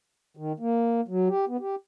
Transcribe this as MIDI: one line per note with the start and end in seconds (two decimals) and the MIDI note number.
0.37 0.52 51
0.60 1.01 58
1.08 1.28 54
1.28 1.45 67
1.48 1.57 59
1.60 1.75 67